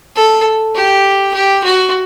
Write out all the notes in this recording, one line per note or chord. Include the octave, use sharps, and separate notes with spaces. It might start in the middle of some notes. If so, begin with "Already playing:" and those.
A4
G4
G4
F#4